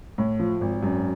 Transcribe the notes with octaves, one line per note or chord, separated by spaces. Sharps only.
A2
F3
G#1
F#2